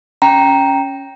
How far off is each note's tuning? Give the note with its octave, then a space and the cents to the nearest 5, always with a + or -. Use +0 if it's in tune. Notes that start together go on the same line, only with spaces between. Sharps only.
C#4 +0 G5 +0 A#5 +0